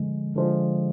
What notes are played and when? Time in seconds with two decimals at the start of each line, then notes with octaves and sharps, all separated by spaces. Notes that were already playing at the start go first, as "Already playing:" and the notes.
Already playing: D3 F3 G#3
0.36 D3 F3 G#3